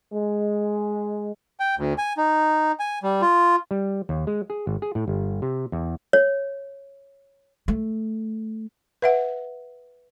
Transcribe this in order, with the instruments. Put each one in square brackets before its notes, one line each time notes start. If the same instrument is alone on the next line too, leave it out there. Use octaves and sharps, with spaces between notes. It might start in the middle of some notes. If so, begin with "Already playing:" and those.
[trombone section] G#3
[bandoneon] G5
D2
G#5
D#4
G#5
G3
F4
[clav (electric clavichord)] G3
D#2
G#3
G#4
G#1
G#4
A2
G1
C3
E2
[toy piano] C#5
[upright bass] A3
[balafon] B4 E5 F#5